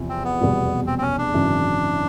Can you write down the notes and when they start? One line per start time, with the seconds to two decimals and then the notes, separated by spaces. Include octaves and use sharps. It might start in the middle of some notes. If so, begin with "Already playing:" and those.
Already playing: E2 C3 F3
0.09 C4
0.24 B3
0.40 F1 E2 B2 G3
0.87 C4
0.98 C4
1.02 C#4
1.18 D4
1.34 G#1 F#2 C#3 E3